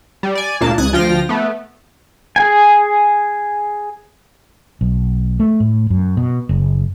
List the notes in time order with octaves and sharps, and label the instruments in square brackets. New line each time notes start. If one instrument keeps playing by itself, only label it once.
[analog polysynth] G3
D5 G#5
D2 A#2 A#3 A5
C#2 D#6 F#6 G#6
D2 F3 F4 G5 F6 A#6
A3 B3
[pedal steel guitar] G#4 G#5
[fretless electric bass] B1
A3
A2
F#2
B2
F#1